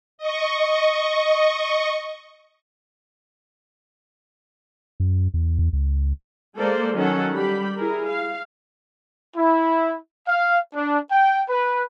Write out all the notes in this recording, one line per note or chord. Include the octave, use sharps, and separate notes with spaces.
D#5 C#6
F#2
E2
E2
C#2
G#3 A#3 A4 C5 D5
D#3 F#3 C#4 A4 F#5
G3 G4 B5
E4 G#4 A#4
F5
E4
F5
D4
G5
B4